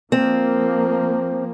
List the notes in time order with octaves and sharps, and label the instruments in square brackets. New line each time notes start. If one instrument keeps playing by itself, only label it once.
[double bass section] F3 A#3 [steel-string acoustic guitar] C4